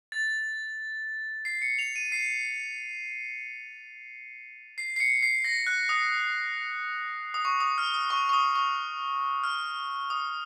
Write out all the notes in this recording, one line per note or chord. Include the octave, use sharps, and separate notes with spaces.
A6
C7
C#7
F7
D#7
C7
C7
C7
C#7
C7
A#6
F#6
D#6
D#6
C#6
D#6
F6
D#6
C#6
C#6
D#6
C#6
F6
D#6